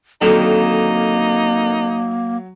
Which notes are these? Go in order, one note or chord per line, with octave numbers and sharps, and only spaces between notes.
F2 D3 D#3 F#3 A#3 D#4